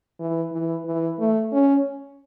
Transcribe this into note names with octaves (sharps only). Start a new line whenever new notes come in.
E3
E3
E3
A3
C#4